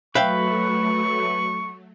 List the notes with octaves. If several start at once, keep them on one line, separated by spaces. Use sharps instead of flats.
F#3 A3 B4 E5 F5 G5 C#6